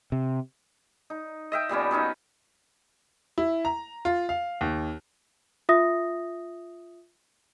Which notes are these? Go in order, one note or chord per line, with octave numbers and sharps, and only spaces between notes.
C3
D#4
D#5 E5 G5
A#2 G3 B3 C#4
F#3 B3 C#4 D#4
E4
A#5
F4
F5
D#2
F4 E5 D#6 A#6